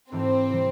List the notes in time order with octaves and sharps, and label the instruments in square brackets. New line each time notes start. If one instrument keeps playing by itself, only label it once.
[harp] G#2 E3 A3 D4 G4 [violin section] C4
[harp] C3 E3 G3